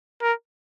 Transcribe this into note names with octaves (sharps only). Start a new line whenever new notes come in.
A#4